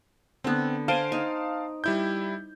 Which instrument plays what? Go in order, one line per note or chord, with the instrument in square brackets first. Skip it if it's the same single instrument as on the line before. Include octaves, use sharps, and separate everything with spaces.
[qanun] D3 B3 [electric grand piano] C4
[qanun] C5 G#5 [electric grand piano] F5 A5 D7
[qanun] D#4
[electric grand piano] G3 E4 G6